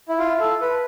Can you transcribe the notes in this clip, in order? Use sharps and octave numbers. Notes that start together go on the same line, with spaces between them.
E4
F4
A4
B4